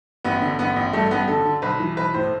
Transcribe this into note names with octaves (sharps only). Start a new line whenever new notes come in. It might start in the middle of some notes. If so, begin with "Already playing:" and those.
A1 B3
D3
A1 B3
A1
G2 A3
A1 B3
D3 A4
D3
B1 B4
E3
B1 B4
A2 C5